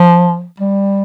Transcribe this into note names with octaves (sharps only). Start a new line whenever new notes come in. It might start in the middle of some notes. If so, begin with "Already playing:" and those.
Already playing: F3
G3